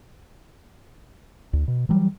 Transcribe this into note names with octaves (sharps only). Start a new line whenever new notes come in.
D2
B2
E3 F#3 G3